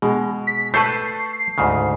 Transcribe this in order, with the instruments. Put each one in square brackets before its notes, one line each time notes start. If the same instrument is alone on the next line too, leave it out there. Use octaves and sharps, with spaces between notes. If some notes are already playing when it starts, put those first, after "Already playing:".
[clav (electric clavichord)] B2 [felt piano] G#3
[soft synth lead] B6
[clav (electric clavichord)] A3 A4 B4 [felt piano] A5 C#6 G6 [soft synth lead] C7
[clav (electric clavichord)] D2 G#2 C#3